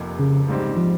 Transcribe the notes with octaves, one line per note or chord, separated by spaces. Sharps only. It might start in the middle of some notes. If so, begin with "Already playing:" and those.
Already playing: F1 F2 C3 F3 A#3
C#3
A#1 G#2 G3 C4 G4
F3